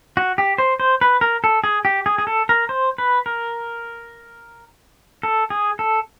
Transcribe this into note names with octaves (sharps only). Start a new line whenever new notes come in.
F#4
G4
C5
C5
B4
A#4
A4
G#4
G4
G#4
G#4
A4
A#4
C5
B4
A#4
A4
G#4
A4